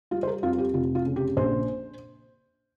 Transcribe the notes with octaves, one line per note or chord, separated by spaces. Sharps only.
G3 F4
C5
A#4
F2 F4
F4
G4
F1 F4
F4
C#3
G4
A#1 C5